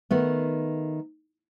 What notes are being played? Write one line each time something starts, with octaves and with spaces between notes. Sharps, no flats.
D#3 A3 B3